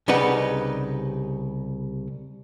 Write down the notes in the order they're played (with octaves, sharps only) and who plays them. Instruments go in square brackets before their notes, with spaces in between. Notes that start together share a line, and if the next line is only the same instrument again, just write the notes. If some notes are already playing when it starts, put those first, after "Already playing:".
[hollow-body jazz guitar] C2 C#3 G3 D#4 B4 F#5